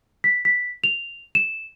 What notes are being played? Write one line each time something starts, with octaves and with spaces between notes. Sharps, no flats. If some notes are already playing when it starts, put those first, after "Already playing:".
B6
B6
F7
E7